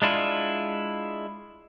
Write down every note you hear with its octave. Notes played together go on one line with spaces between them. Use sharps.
G#3 D4 E4 F4